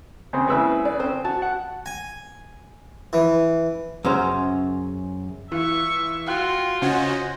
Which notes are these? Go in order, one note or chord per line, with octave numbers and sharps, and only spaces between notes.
C#3 C4
C#3 G#3 A#3 E4 B4 E6
D5
C4 C#4 C5
F#4 A5
F#5
G#5
E3
F#2 C#3 C5 A#5
E3 E4 F4 E5 C#6
F4 F#4 F5 G5 F#6
C#3 C#4 F#4 C5 D#5 F#5 G#6